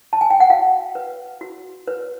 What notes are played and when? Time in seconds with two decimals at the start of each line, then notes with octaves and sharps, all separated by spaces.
0.13 A5
0.21 G#5
0.30 G5
0.40 F#5
0.50 F#4 F5
0.95 B4
1.41 F#4
1.87 B4